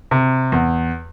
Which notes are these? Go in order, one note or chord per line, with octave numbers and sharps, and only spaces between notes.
C3
E2